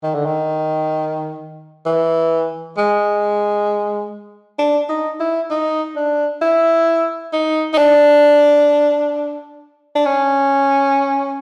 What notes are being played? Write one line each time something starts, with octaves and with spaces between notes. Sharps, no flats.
D#3
D3
D#3
E3
G#3
D4
D#4
E4
D#4
D4
E4
D#4
D#4
D4
D4
C#4